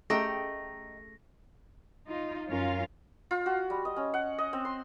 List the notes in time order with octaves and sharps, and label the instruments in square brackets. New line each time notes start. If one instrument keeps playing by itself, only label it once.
[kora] A3 [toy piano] C#4 G4 G#4 [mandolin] D#5 G5 A#5 [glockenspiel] A#6
[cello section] D#4 F4
F#2 C#4 F4 A#4 F5
[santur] F4
F#4
G3
D#5
C#4
F#5
D#5
C4
C6